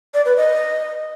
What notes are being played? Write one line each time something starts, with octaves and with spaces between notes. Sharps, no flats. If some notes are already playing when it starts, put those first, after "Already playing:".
D5
B4
D#5